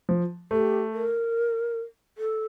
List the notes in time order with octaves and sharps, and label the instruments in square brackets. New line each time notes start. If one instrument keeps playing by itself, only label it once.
[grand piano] F3
[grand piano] A3 [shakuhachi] G4
[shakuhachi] A#4
A4